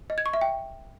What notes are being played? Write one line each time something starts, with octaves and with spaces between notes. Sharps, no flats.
D#5
G#6
C#6
E5
G5